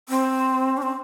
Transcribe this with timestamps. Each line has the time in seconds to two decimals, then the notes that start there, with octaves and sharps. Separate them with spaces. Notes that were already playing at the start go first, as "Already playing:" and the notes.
0.09 C4
0.77 D4
0.82 C4